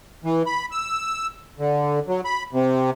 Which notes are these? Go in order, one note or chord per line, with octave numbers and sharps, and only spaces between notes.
E3
B5
E6
D3
F#3
B5
C3